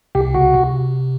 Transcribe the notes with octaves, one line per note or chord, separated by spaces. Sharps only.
C2 C3 G4
C#2 C#3 F#4
C3